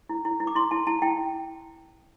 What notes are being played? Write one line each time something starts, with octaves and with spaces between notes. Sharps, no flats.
E4
E4
E4
D6
E4 C6
E4 A5
E4 A5
E4 G5